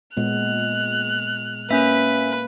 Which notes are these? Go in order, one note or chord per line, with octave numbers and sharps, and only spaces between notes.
A#2 G#3 B3 F6 F#6
A#3 C#4 B4 E5